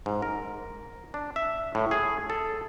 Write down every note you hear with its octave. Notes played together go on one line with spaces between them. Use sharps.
G#2
A#4
D4
E5
A2
G#4
A4